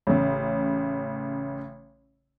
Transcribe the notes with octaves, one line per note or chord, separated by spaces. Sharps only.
A1 C#3